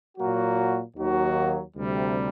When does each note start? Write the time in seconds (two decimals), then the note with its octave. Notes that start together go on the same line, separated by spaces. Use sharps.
0.18 A#2 F#3 A#3 F#4
0.97 D#2 D#3 F#3 A#3 F#4
1.75 D2 C3 G3